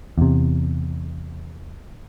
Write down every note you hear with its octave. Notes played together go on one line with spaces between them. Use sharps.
E2 C3